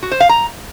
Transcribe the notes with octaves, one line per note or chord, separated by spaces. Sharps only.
F#4
C5
F5
A#5